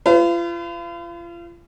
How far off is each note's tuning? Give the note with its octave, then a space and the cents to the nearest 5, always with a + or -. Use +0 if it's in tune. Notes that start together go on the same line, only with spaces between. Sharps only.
F4 -35 B4 +45